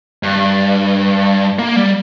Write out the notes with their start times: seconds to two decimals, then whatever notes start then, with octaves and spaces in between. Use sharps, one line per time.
0.23 G2
1.59 A#3
1.76 G3